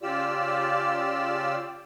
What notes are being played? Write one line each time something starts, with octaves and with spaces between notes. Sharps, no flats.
C#3 F4 G4 D5 E6